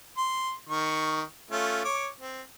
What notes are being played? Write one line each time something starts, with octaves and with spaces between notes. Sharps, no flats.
C6
D#3 C#6
A3 C#4 F4
C#5 D6
C4